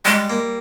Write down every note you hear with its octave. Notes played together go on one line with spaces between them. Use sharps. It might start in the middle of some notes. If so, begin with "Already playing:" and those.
G3 G#3
A#3